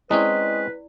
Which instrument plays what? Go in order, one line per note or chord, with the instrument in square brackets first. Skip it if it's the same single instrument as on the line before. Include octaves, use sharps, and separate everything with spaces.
[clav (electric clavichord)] G#3 C4 C#4 [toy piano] E4 D5 [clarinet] B4 [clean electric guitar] D#5